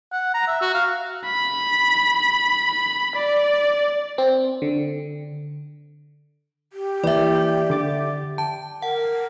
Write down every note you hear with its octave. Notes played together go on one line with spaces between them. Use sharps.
F#5
A#5
E5
F#4
F5
B5
D5
C4
D3
G4
E3 A#3 D5 E5
D3 D6 A6
G5 A5
A#4 F#5